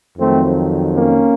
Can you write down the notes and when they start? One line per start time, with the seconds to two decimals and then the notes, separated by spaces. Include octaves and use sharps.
0.17 F2 D#3 F#3 A3 C4
0.93 A#3 C#4